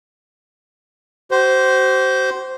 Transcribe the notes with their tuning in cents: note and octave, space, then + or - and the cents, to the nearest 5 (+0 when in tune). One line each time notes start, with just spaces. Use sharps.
F#4 +45 C5 -5